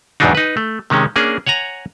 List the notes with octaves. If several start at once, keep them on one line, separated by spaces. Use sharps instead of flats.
E2 G#2 B2 F#3 D4 D#4
D#4 B4
A3
C3 D#3 G#3 C#4
A#3 C#4 D4 G#4
C#5 F#5 G#5 A#5